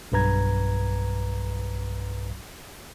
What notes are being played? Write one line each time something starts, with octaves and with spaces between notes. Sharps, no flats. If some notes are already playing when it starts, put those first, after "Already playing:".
B1 G2 B4 A#5 G#6